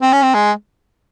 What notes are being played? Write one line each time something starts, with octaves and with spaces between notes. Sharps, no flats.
C4
C#4
C4
G#3